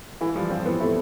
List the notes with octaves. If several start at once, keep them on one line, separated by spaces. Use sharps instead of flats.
E3 E4
F3 G3
F3 C4
E3 B3
A3 E4